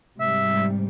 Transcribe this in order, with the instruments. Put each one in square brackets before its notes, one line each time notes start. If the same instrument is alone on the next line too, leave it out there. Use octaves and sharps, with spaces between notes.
[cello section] G#2 C3 G3 [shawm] E5